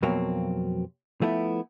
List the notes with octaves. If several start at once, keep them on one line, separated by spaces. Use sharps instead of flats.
F2 B2 F#3 A#3 C4
F3 A3 B3 E4